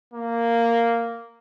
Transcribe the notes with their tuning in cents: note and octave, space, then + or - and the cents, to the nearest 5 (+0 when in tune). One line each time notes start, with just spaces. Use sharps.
A#3 -5